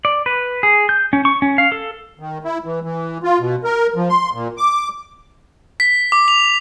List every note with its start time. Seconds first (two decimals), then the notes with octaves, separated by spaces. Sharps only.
0.05 D5
0.26 B4
0.63 G#4
0.89 G6
1.13 C#4
1.25 C#6
1.42 C#4
1.58 F5
1.72 A4
2.19 D#3
2.44 E4
2.65 E3
2.83 E3
3.23 F4
3.40 B2
3.64 A#4
3.96 F3
4.09 C6
4.33 A#2
4.57 D6
5.80 B6
6.12 D6
6.28 F7